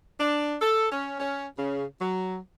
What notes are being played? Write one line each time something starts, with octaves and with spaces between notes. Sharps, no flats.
D4
A4
C#4
C#4
C#3
F#3